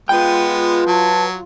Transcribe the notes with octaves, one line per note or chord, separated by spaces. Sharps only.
G#3 B3 F4 B4 G5
F#3 A5